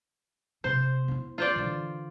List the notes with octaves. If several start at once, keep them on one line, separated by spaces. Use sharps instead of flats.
C3 B3 C5
B3 E4
F4 C5 D5
D3 E3